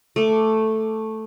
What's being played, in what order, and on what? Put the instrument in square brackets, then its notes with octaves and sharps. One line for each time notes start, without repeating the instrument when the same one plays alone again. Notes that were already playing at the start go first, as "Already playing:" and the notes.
[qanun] A3 D6